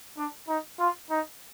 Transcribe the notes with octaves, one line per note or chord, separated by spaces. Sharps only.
D4
D#4
F4
D#4